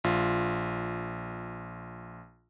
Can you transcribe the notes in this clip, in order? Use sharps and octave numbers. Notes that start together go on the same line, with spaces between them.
A#1 F4